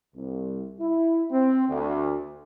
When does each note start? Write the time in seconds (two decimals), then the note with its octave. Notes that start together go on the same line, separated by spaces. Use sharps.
0.14 C2
0.79 E4
1.30 C4
1.68 D2